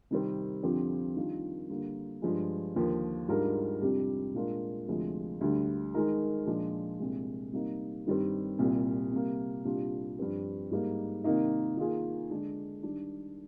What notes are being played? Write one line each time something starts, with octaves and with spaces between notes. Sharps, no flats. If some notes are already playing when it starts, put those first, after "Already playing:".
C3 D#3 G3 C4
F2 D3 F3 C4 G4
D#3 G3 D4 F4
D3 G3 A#3
G2 F3 G#3
D#2 D3 F3
G#2 G3 D4 F4 A#4
F2 C3 G3 D4 G4
A#2 G#3 D4 F4 A#4
D2 C3 F3 G#3
D2 D3 G3
D#3 G#3 D#4 A#4
A#2 F3 G#3 D4 G#4
C2 A#2 G#3
C3 G3 A#3 D#4
G2 D#3 G3 C4
C2 A#2 G3
C3 G3 A#3
C2 A#2 G3 D4 F4
G2 F3 C4 G4
G#2 G3 A#3 D#4
C3 D#3 A#3 D#4
D#3 A#3 F4 G#4
D3 G#3 D4
D#3 G3 D4